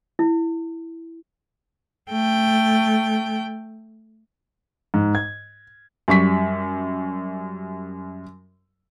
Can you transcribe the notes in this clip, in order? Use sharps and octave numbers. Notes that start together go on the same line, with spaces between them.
E4
A3 G5
G#2
G#6
F#2 G3 C#6 B6